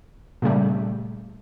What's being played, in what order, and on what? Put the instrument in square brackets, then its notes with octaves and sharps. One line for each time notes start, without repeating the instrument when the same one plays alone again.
[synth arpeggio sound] A#2 C#3 G3 A3